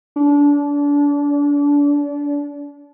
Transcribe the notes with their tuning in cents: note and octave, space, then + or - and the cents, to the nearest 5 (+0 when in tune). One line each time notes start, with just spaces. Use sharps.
D4 -30